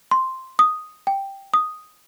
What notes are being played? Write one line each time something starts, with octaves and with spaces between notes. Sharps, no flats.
C6
D#6
G5
D#6